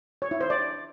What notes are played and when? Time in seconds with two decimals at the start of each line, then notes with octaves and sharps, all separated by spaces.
0.22 C#5
0.31 E4
0.41 C5
0.50 D5